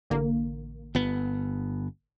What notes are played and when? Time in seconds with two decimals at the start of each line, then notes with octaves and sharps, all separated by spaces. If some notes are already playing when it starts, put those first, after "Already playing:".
0.10 A1 D3 A#3
0.95 G1 B3